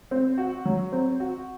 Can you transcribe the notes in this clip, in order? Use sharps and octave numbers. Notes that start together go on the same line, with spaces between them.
C4
F#4
F#3
C4
F#4